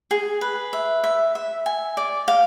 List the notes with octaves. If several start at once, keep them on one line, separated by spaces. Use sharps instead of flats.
G#4
B4
E5
E5
E5
G#5
D5
F5